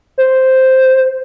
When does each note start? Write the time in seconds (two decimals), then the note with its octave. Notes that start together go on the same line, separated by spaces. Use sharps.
0.18 C5